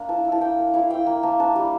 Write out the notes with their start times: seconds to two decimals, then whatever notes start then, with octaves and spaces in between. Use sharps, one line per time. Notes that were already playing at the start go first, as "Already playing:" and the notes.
Already playing: A#3 D4
0.09 E4 A5
0.25 E4
0.32 A5
0.41 A#3 G5
0.58 A#3
0.74 E4 F5
0.90 E4 G5
1.07 A#3
1.23 A#3 A5
1.39 D4 A5
1.56 G3